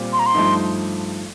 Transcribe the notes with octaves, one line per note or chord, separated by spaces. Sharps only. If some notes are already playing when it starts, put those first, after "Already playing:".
Already playing: A#2 G3 C4 F4
C6
A#5
C6
G2 F3 A3 D#4